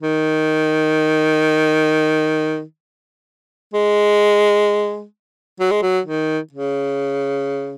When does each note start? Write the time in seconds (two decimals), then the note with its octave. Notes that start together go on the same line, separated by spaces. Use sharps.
0.01 D#3
3.74 G#3
5.60 F#3
5.71 G#3
5.82 F#3
6.06 D#3
6.53 C#3